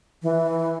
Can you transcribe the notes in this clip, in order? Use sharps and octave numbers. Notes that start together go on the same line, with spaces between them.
E3